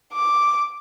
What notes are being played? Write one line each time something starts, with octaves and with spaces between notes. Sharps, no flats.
D6